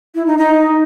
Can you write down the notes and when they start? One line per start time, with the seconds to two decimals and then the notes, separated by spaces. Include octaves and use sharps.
0.15 E4
0.26 D#4
0.38 D#4